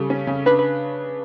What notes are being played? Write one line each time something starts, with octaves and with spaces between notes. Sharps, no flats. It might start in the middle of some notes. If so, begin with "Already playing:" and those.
Already playing: C#3 G3 A4
C#4
C#3
D4 B4
B4